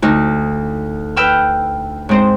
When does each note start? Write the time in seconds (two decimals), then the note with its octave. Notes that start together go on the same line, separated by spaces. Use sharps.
0.02 D2 D#4
1.16 B4 G5 E6 F6
2.09 G#2 C4 C5